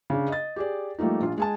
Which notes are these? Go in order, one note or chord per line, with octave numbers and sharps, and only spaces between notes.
C#3 D4
D#5 A6
G4 G#4 D5
F3 G3 A3 A#3 D#4
A#1 F4
G#3 G#5 A5